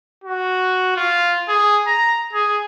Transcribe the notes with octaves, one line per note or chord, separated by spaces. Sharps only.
F#4
F4
G#4
A#5
G#4